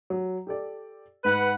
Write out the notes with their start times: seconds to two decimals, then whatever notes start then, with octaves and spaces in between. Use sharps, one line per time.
0.10 F#3
0.47 G4 A4 D5
1.25 G#2 B4 F#5